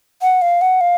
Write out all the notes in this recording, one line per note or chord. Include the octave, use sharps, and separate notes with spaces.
F#5
F5
F#5
F5